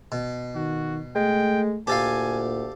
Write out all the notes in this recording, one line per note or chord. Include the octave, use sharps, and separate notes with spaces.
B2
D#3 F#4
G#3 A3 G5
D2 A#2 G4 A4 F5 G#5